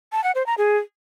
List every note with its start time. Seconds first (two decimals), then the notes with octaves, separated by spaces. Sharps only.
0.12 A5
0.24 F#5
0.35 C5
0.46 A#5
0.58 G#4